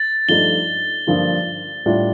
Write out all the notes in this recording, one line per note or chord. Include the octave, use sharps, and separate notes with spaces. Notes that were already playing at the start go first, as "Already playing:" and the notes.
Already playing: A6
G2 F3 A3 D#4 G7
G2 D3 F3 A#3 F4
A2 G3 D4 F4